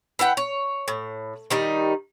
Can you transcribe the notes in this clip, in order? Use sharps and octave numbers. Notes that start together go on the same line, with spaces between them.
E4 B4 F#5 G5
C#5
A2
D#3 G3 D#4